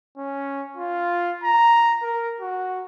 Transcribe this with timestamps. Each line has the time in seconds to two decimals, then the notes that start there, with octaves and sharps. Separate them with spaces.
0.18 C#4
0.77 F4
1.44 A#5
2.03 A#4
2.40 F#4